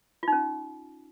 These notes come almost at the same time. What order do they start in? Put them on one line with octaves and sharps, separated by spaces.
F4 D#4 C#4